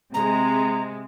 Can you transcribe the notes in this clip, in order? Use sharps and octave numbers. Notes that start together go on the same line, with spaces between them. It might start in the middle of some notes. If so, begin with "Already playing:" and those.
C3 G#3 A#5